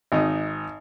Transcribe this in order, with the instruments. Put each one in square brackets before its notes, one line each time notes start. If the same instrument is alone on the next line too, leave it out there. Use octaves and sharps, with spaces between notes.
[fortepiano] G#1 D#4